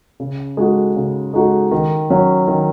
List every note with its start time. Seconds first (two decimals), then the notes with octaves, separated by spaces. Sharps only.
0.20 C#3
0.57 G#3 D#4 F#4 A4
0.96 C#3
1.34 G#3 D#4 F#4 A4
1.71 D#3
2.10 F#3 C#4
2.48 D#3